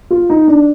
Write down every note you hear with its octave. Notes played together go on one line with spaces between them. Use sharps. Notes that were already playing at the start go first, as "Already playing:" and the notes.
F4
D#4
D4